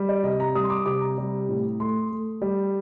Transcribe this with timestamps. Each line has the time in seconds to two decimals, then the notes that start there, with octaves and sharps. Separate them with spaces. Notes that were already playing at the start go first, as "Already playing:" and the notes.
Already playing: G3
0.09 D5
0.24 C3 D#5
0.40 A#5
0.55 G3 D#6
0.64 C6
0.70 D6
0.86 C3 D6
1.01 A#5
1.18 G3
1.49 A2
1.80 A3 C6
2.11 A3
2.42 G3